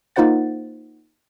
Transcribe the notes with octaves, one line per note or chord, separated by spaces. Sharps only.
A#3 D#4 F4 C5 F#5 A6